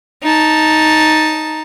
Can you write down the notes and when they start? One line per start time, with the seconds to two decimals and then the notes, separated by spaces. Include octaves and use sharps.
0.23 D#4 A5